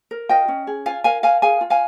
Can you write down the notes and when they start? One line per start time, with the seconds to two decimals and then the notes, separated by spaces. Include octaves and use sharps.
0.11 A#4
0.29 F4 D#5 G5
0.48 C#4
0.67 G#4
0.86 F4 F5 G#5
1.04 A#4 F5 G#5
1.23 A#4 F5 G#5
1.42 G#4 F5 G#5
1.61 F4
1.70 F5 G#5